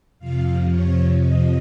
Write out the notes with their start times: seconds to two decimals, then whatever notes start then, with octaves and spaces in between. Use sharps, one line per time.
0.19 F2 C3 F3 F5
0.69 C#5
1.20 D#5